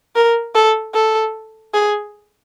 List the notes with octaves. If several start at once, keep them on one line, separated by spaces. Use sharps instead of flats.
A#4
A4
A4
G#4